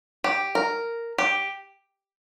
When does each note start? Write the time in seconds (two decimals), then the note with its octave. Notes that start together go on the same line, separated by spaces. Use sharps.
0.24 G4
0.55 A#4
1.18 G4